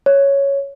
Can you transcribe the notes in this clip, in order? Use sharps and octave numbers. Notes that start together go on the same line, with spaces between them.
C#5